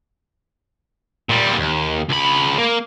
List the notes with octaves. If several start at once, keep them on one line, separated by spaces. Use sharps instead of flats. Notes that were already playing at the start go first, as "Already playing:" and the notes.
A#2 G3
D#2
C#2 B5
A#3